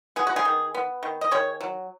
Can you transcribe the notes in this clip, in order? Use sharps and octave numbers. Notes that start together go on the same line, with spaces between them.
B3 G#4
F#4
D#4 G#4
D#3
B3
D#3
D#5
D#3 G#4 C#5
F#3